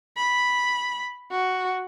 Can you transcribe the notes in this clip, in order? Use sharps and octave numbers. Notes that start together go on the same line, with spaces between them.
B5
F#4